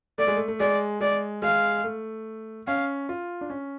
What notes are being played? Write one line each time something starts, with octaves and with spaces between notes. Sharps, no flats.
A3 D5
G#3
A3
A3
G#3 D5
G#3 D5
G#3 F5
A3
C#4 F5
F4
D4
C#4